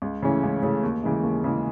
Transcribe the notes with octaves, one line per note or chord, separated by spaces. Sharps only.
C#2
C#3 E3 A3 C#4
C#2
C#3 E3 A3 C#4
D#2
C#3 E3 G#3
D#2
C#3 E3 G#3